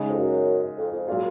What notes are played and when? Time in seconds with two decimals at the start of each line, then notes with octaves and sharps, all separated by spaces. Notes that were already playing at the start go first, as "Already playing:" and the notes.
Already playing: C#3 G#3 D#4
0.10 F2
0.17 F#2
0.77 F2
0.92 F2
1.07 A#2 F#3 A#3 F4 G#4